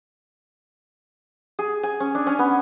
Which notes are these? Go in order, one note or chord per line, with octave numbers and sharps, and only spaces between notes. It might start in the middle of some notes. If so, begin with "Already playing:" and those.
G#4
G#5
C#4
D4
C#4
B3